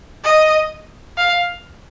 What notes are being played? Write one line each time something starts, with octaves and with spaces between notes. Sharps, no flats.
D#5
F5